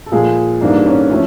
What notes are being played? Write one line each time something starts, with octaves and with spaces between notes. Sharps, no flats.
A4
A#2 F3 G#3 G#4
G#2 E3 G3 A#3 D4
C#4
A2 F3 A3 C#4